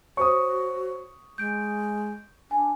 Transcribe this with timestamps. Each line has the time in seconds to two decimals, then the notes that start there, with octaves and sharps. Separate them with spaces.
0.17 F#4 C5 C#5 C#6 D#6
1.38 G#3 G6 D7
2.51 D4 G#5